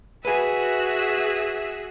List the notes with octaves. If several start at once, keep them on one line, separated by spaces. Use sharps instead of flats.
F#4 G#4 B4 E5 G#5